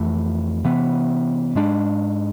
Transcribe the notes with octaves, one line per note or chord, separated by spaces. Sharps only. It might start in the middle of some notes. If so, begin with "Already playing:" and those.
Already playing: F2 E3 A3
C3 E3 B3
G#2 G#3 D4